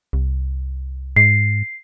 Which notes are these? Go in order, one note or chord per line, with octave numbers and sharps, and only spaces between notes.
C2
G#2 C7